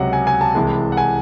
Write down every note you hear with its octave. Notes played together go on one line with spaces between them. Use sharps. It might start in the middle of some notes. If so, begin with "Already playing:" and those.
Already playing: C#2 C3 F#3 F#5
G#5
G#5
A5
C2 C3 E3 G#3
F#5
G#5